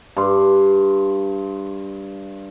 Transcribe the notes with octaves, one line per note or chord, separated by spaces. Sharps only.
G2 C6